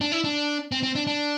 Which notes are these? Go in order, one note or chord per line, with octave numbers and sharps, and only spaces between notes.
D4
E4
D4
C4
C4
D4
D4